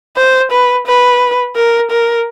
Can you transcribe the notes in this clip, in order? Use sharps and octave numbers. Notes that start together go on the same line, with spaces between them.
C5
B4
B4
A#4
A#4